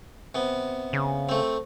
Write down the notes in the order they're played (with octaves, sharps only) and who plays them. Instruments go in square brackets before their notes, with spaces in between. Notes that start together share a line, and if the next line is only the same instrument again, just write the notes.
[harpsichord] C3 B3
[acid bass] C#3
[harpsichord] A3 C4